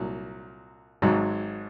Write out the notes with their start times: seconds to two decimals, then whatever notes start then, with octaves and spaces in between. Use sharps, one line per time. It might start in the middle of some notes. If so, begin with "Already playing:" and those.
Already playing: C2 A#2 F#3
1.02 G#1 G#2 F#3